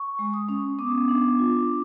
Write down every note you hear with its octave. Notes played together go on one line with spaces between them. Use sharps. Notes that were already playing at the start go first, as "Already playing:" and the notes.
Already playing: C#6
G#3
D#6
C#4
B3 D6
D4
F4